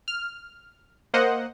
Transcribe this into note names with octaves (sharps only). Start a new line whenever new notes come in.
F6
A#3 C5 D#5 F#5